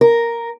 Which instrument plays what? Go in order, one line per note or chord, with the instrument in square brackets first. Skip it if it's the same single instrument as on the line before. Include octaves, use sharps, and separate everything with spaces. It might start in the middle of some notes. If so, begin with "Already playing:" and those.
[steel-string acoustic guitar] A#4